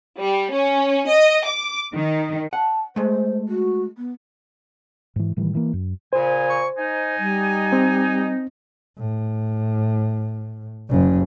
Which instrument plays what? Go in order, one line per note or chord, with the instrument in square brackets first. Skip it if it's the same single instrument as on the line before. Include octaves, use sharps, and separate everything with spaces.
[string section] G3
C#4
D#5
D6
D#3
[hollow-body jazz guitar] F#5 [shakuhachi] A5
[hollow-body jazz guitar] G#3 A3 [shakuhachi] C5
[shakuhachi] F#4
B3
[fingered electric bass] G#2 E3
A2 D#3 E3 G3
E3 A#3
F#2
[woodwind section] A#2 C#3 G#5 [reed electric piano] C5
[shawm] C#6
[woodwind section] D#4 [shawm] G#5
[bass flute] G3
[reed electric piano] C4
[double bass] A2
F#1 C#3